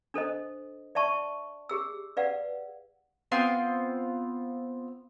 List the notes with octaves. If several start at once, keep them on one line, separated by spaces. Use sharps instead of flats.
D4 A4 C5 D#5
D5 E5 A5 C#6
G4 G#4 E6
B4 D5 F5 F#5
B3 C4 F4 C6